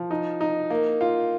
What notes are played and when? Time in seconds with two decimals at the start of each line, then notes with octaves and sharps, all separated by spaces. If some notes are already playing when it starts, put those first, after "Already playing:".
Already playing: F3
0.11 D#4
0.41 D#4
0.70 A#3
1.01 F4